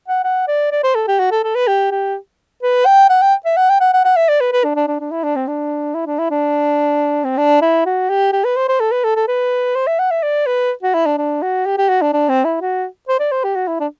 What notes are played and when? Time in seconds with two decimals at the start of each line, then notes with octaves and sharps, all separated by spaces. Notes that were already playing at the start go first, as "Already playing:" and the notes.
0.08 F#5
0.24 F#5
0.48 D5
0.71 D5
0.84 C5
0.95 A4
1.08 G4
1.19 F#4
1.31 A4
1.44 A4
1.55 B4
1.68 G4
1.91 G4
2.62 B4
2.86 G5
3.09 F#5
3.22 G5
3.45 E5
3.57 F#5
3.69 G5
3.80 F#5
3.93 F#5
4.05 F#5
4.17 E5
4.28 D5
4.41 B4
4.53 B4
4.64 D4
4.76 D4
4.87 D4
5.00 D4
5.11 E4
5.24 D4
5.36 C4
5.48 D4
5.95 E4
6.06 D4
6.19 E4
6.31 D4
7.24 C4
7.38 D4
7.62 E4
7.86 F#4
8.09 G4
8.33 G4
8.45 B4
8.57 C5
8.69 C5
8.80 A4
8.92 B4
9.04 A4
9.16 A4
9.28 B4
9.76 C5
9.87 E5
9.99 F#5
10.11 E5
10.23 D5
10.47 B4
10.83 F#4
10.94 E4
11.06 D4
11.18 D4
11.42 F#4
11.66 G4
11.77 G4
11.89 F#4
12.02 D4
12.13 D4
12.29 C4
12.45 E4
12.61 F#4
13.08 C5
13.19 D5
13.32 C5
13.44 G4
13.55 F#4
13.67 E4
13.80 D4